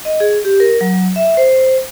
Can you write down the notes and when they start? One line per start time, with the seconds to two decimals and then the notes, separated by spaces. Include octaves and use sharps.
0.05 D#5
0.20 G#4
0.45 G4
0.60 A#4
0.81 F#3
1.16 E5
1.37 C5